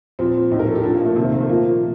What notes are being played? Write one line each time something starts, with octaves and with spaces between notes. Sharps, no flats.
A#2 F3 C4
A2 F3 D#4
A#4
A4
G4
A#2 F3 D4
A#3
A3
C3 D#3 A#3 C4
A#3
A3
A#2 F3 A#3